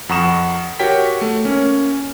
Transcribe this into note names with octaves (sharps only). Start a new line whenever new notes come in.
F2 F#5 A#5 C#6 D#6 E7
F#4 G4 A#4 C#5 G5 B6
A3
A#3 C#4